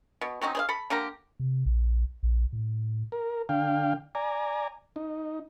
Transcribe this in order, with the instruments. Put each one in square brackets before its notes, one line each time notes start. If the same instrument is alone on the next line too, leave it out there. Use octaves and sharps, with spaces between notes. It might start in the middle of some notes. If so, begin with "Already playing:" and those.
[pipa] B2
F#3 C4 C#4 D#4
G#4 C5 F5
A4 B5
D3 A#3 G4 A#5
[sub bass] C3
A#1
A#1
A2
[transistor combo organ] A#4
D3 F5 G5
D5 G#5 A#5
D#4